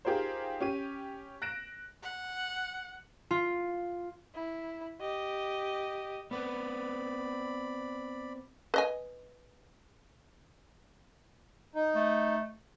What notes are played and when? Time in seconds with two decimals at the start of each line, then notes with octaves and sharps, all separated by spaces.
0.05 D#4 F4 G4 G#4 A#4 C5
0.60 C#4 G4 D#7
1.42 F#6 A#6 D7 E7
2.03 F#5
3.31 F4
4.35 E4
5.01 G4 D#5
6.31 B3 C4 B4 D5 B5
8.74 B4 D#5 G#5
11.75 D#4
11.95 A3